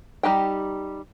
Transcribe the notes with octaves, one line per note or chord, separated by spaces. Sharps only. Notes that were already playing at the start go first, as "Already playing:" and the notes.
G3 D#4 G4 G5